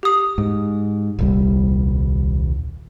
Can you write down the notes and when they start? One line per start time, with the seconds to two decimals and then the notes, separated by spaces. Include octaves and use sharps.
0.03 G4 D#6
0.38 G#2
1.19 D#1 C2 G3